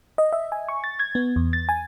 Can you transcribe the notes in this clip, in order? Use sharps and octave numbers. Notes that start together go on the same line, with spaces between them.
D#5
E5
G#5
C#6
A6
G#6
B3
E2
A6
G#5